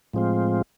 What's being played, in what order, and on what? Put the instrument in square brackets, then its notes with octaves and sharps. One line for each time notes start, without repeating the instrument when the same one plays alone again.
[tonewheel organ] A2 F3 G#3 C4 F4